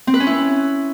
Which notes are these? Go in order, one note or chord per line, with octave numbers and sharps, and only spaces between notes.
C4
B4
C#4
E4